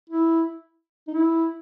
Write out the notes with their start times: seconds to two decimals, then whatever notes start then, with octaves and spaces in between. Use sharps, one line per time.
0.09 E4
1.08 D#4
1.14 E4